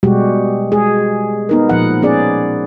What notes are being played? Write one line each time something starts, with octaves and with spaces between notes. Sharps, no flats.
B2 G3 G#3 F#4 G4
G#3 G#4
B3 D#4 A#4
A#2 F3 F#5
B3 C#4 G#4 D5